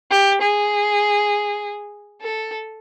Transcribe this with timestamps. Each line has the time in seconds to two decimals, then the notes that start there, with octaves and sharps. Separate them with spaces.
0.11 G4
0.41 G#4
2.22 A4